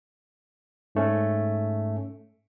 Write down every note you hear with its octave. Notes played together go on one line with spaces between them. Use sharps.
G#2 A3 C#4